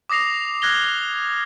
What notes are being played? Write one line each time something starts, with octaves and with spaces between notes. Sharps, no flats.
D6 D#6 A#6 C7 F7
D#6 F6 F#6 G#6 A#6 G7